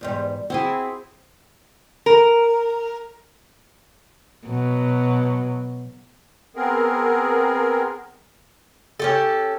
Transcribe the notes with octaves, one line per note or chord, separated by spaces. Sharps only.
E2 G#2 G3
C4 E4 F#4 G#4
A#4
B2 F#3
B3 C4 G#4 A#4
C#4 G4 A4